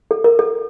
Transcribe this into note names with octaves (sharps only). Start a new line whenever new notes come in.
A4
A#4
A4